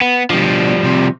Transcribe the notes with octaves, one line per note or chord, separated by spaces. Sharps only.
B3
B2 F3 G3 D4
C3